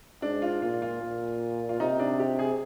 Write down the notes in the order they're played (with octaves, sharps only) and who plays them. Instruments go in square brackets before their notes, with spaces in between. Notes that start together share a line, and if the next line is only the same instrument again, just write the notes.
[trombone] G#2 [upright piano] D4
[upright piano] F4
[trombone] A#2 [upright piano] F4
[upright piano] F4
[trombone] A#2
[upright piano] F4
[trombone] C3 [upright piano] D#4
[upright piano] D4
G4
G#4